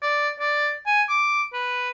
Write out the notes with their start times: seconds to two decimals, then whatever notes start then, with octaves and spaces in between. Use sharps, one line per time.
0.02 D5
0.40 D5
0.86 G#5
1.09 D6
1.53 B4